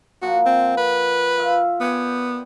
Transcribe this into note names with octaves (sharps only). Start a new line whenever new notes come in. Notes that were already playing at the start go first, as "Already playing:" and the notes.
A#2 F3 F#4 F#5
C4
B4
F4 E5 F5
B3 D5 G5 G#5